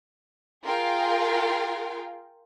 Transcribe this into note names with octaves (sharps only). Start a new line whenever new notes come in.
F4 G#4 A#4 F5 G5